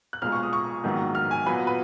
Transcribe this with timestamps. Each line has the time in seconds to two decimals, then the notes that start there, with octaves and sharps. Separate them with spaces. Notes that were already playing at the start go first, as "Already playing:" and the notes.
0.13 F#6
0.22 B1 A#2 G#3 F6
0.32 C#6
0.43 D#6
0.53 C#6
0.84 A#1 G#2 D#3 F#3 B3
1.15 F6
1.31 G#5
1.46 A#2 F#3 B3 B4
1.67 B4